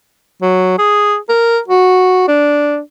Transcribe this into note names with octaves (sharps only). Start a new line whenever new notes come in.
F#3
G#4
A#4
F#4
D4